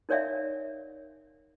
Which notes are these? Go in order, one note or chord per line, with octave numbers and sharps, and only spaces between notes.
D#4 A#4 C#5 D5 E5 F5